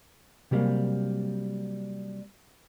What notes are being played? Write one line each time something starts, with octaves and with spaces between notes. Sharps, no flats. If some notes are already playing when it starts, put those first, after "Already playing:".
C3 F#3 G3 A#3